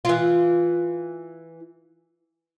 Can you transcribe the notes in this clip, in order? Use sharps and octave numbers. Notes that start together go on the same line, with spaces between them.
E3 F4